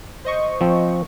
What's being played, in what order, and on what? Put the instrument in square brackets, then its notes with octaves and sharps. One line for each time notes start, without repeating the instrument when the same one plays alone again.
[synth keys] C5 D#5 C#6
[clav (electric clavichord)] F3 C4